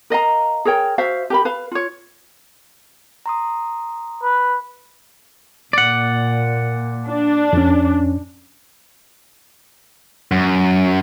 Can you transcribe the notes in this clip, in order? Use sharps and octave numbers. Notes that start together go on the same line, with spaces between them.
A#4 D#5 F5 A#5
G#4 A#4 C#5 G5
F#4 C5 E5 F5
G4 A#4 B5
B4 F5
F4 C#5
A#5 C6 D#6
B4
A#2 D5 F#5
D4
F2 C#4
F#2